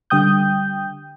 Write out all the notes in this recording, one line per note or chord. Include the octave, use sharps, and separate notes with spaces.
D3 G3 G5 D#6 G6